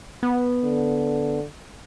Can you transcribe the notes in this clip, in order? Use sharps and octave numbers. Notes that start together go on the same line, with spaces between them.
B3
D3